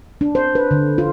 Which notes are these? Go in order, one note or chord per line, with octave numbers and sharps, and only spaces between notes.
D4
C5
B4
D3
F4